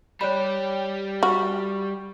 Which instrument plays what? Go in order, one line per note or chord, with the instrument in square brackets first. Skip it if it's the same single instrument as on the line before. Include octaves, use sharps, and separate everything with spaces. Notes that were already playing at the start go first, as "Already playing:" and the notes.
[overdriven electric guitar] G3 G4 [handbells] C#5 D5 B5
[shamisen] F#4 [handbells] B5 C#6 F6